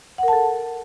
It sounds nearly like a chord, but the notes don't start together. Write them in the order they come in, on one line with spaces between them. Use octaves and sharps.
F#5 A#4 A5 A4